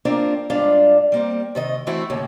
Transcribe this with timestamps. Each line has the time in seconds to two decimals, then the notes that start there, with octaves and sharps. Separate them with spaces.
0.05 A#3 C4 D4 F4 A#4
0.50 G#2 G3 D4 F4 F5
1.12 G3 A#3 C4
1.55 C3 D#3 D#5
1.87 E3 A3 C4 E4 F#4
2.10 D#2 A2 C#3 A#3